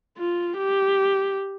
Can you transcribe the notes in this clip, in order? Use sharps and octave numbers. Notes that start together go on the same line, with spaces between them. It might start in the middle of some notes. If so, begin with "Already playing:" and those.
F4
G4